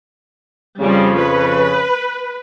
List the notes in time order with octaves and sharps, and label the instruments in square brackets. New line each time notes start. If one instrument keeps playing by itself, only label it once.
[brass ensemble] F2 C#3 [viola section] F3 G3
[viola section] B4